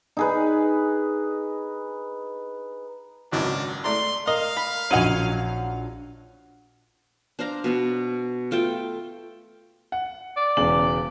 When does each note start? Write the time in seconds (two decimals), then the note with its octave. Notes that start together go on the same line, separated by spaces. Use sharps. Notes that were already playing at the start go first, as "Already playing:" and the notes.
0.17 D#4 G#4 B4
3.32 G#1 C#2 F#2 D4
3.84 A3 D5 A#5 C6
4.27 A#4 D#5 F5
4.57 B5
4.91 A#1 F#2 F#3 D#4 F#5 G#5 D#7
7.39 D4 C5 F5 A#5
7.64 B2 B3 F#5
8.51 A3 F4 A4 G5
9.92 F#5
10.36 D5
10.57 E1 C#3 F#7